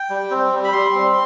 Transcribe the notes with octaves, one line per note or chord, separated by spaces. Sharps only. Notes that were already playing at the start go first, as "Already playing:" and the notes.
Already playing: G5
G3
C4
G3
B5
G3 C6
C4